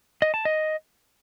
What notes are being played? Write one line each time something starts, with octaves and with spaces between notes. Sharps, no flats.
D#5
A5
D#5